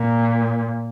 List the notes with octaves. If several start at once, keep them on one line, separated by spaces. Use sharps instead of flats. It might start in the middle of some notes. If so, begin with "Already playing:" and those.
Already playing: A#2